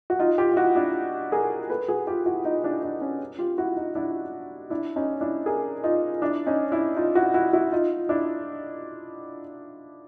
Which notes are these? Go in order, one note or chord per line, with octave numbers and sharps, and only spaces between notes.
F#4
D#4 F4
F4 G4
F4
E4 F#4
D4 E4
G#4 A#4
A4 B4
F#4 G#4
F4 G4
E4 F#4
D#4 F4
D4 E4
D4 E4
C#4 D#4
F4 G4
E4 F#4
D#4 F4
D4 E4
D4 E4
C#4 D#4
D4 E4
G#4 A#4
D#4 F4
D4 E4
C#4 D#4
D4 E4
D#4 F4
E4 F#4
E4 F#4
E4 F#4
D#4 F4
D4 E4